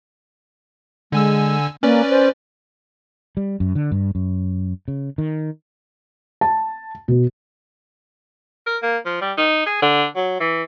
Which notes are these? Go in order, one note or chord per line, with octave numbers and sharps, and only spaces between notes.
D3 G#3 G#5 E6
A#3 C#4 B4 D5
C5
G3
F#2
D3
G2
F#2
C#3
D#3
A5
B2
A#4
A#3
F3
G3
D#4
G#4
D3
F#3
E3